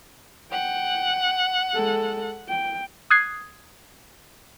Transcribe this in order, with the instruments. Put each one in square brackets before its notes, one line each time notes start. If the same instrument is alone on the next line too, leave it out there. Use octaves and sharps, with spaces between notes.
[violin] F#5 [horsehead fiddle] G5
[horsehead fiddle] G#3 A4
G5
[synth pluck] D#6 F#6 G#6 C7